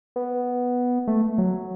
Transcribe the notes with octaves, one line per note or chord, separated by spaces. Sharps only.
B3
A3
F#3